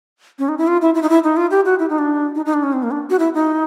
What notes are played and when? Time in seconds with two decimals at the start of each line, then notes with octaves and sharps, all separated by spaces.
0.39 C#4
0.49 D#4
0.58 E4
0.68 F4
0.82 E4
0.95 E4
1.02 D#4
1.09 E4
1.24 D#4
1.37 F4
1.51 G4
1.65 F#4
1.79 E4
1.89 D#4
1.99 D4
2.35 D#4
2.46 D#4
2.54 D4
2.63 C#4
2.73 C4
2.83 A#3
2.91 D4
3.10 F#4
3.19 E4
3.34 D#4